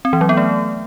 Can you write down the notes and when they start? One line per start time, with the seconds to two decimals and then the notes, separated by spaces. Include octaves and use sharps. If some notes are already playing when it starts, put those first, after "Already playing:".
0.05 C4
0.13 E3
0.21 F#3
0.29 B3
0.37 A3